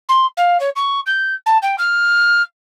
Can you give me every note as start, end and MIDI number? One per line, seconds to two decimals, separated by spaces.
0.09 0.26 84
0.37 0.57 77
0.60 0.70 73
0.76 1.00 85
1.06 1.34 91
1.46 1.58 81
1.62 1.76 79
1.78 2.42 89